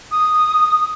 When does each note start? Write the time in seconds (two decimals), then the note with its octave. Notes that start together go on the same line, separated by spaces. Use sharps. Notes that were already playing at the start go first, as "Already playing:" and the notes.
0.11 D#6